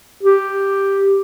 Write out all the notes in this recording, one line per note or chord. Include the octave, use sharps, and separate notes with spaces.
G4